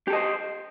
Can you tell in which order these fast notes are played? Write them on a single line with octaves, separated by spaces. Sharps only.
G4 A4 D#5 C5